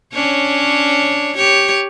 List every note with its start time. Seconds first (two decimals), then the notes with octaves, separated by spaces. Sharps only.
0.13 C#4 D4 C#5
1.36 G4 C#5